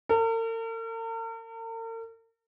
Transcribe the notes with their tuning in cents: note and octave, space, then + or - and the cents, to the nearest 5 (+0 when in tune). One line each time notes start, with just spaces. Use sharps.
A#4 -45